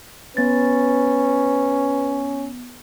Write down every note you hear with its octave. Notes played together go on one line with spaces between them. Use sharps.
B3 C#4 B4 A6